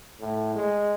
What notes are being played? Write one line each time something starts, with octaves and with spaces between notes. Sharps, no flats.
A2
G#3